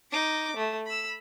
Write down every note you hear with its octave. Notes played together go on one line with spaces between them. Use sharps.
D#4 D6
A3
B5 E6